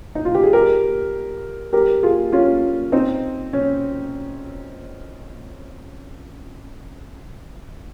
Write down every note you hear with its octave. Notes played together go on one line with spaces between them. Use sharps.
D#4
F4
G4
G#4
G4 A#4
G4 A#4
F4 G#4
C#4 F4
C4 D#4
C#4